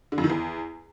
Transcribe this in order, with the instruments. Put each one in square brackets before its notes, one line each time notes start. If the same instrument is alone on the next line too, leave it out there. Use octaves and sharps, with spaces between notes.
[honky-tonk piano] D3
F2
D#3
E2